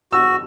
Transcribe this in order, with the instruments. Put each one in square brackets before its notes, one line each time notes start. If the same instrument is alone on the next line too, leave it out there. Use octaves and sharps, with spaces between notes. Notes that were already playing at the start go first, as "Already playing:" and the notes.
[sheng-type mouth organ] F#4 [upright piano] E6